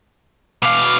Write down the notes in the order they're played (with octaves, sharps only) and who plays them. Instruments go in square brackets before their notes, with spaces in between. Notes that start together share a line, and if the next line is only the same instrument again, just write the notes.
[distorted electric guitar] B2 F5 [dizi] D6